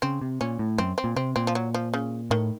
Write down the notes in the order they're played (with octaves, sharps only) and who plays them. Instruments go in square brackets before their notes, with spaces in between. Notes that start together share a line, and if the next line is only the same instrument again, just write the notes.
[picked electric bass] C#3 [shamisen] C4
[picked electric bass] C3
[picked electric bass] A#2 [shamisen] C#4
[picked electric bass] A2
[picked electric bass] F#2 [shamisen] C4
[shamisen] C4
[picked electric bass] A#2
[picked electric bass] C3 [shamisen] C4
[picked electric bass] A#2 [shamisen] C4
[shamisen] F3
F#3
F3
C#3
[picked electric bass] A2 [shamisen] D#3